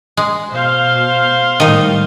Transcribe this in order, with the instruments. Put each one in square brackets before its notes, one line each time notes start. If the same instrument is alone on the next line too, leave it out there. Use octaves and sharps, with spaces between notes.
[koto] G#3
[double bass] B2 [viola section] C5 F5 C6
[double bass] A2 G3 [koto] D#3 D#4